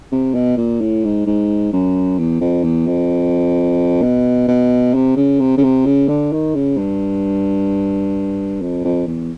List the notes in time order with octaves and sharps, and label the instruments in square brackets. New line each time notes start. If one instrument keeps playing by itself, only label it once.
[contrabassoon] C3
B2
A#2
A2
G#2
G#2
F#2
E2
F2
E2
F2
B2
B2
C3
C#3
C3
C#3
C3
C#3
D3
D#3
C#3
G2
F2
F2
E2